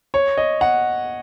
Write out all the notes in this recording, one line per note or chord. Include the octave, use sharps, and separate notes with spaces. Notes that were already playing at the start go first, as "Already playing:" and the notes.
C#5
D#5
F#5